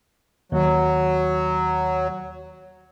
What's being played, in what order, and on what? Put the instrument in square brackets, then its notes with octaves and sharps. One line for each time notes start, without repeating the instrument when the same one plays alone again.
[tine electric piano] D#2 [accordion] F#3